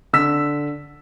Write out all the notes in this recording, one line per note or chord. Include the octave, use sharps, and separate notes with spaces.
D3 E6 B6